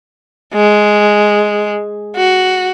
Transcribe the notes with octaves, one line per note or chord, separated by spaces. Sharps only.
G#3
F#4